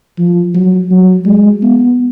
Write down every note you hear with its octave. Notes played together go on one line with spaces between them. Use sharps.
F3
F#3
F#3
G#3
B3